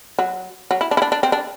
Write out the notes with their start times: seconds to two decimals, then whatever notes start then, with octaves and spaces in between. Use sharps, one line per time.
0.19 F#3
0.71 F#3
0.81 E4
0.91 D4
0.97 E4
1.02 D4
1.12 D4
1.23 C4
1.32 D4